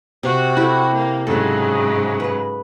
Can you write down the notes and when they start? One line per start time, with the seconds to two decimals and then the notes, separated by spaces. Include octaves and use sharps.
0.23 C3 F#4
0.57 E4 G4 A4
0.94 A#3
1.27 G#2 C#3 F#3 A4
2.20 B4